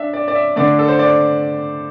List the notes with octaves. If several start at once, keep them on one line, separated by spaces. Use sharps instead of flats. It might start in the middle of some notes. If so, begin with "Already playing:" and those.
Already playing: D4 E5
D5
D5
E5
D3 A3 D5
A4
C5
D5